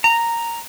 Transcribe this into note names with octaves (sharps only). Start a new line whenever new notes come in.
A#5